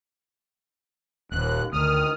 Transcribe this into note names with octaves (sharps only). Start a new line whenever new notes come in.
D#1 D#2 F#6
D2 D#3 D#6 F6